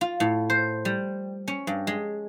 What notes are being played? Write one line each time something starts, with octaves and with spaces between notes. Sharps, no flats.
F4
A2
C5
G3
C#4
G2
G#3